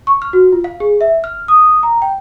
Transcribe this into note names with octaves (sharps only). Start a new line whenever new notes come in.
C#6
F6
F#4
F4
F5
G#4
E5
F6
D#6
A#5
G5